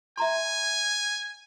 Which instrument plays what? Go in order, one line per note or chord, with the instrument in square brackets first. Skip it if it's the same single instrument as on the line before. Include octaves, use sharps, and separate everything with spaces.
[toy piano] E5 A#5 C6 [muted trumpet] G#5